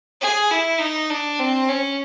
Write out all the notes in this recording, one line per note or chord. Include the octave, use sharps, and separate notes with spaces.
G#4
E4
D#4
D4
C4
C#4